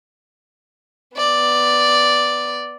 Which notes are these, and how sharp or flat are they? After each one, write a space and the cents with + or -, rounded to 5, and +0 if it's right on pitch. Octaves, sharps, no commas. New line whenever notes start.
B3 +0 D5 +0